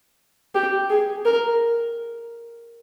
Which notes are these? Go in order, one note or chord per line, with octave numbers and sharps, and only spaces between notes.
G4
G#4
A#4